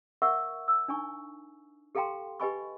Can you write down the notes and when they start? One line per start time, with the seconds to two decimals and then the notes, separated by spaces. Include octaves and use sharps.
0.22 A#4 E5 F#5 C#6 E6
0.68 E6
0.88 D4 D#4 G#5 C#6
1.95 G4 A4 F5 G5 A#5 C6
2.40 G4 B4 D#5 G#5 B5 C#6